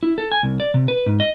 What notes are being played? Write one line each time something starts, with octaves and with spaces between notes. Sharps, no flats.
E4
A4
G#5
C2
D5
C3
B4
G#2
D#5